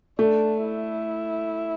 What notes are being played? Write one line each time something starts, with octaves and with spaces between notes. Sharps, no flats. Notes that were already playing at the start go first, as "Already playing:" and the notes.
A3 D4
E4